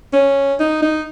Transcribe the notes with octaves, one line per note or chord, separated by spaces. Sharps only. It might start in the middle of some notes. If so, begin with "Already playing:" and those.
C#4
D#4
D#4